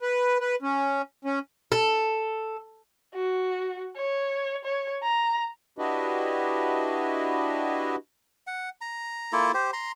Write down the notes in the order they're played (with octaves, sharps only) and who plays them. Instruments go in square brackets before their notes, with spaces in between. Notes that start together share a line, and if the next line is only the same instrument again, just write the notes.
[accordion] B4
B4
C#4
C#4
[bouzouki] A4
[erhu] F#4
C#5
C#5
A#5
[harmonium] D4 E4 F#4 G4 B4 D#5
[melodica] F#5
A#5
A#3 E4 F4 A4
G4 C5
A#5 C6